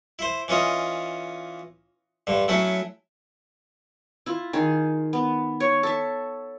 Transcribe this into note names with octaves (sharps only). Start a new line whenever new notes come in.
E4 C5
E3 C#4 F4 D#5
G2 D3
F#3 A3 C#4 E4
E4 F4
D#3 G#4
B3
C#5
A4 E5